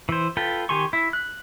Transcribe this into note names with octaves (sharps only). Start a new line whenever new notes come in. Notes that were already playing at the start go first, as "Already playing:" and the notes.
E3 C5
F4 A4 B4 G5
D#3 G4 G#5 C6 C#6
E4
F#6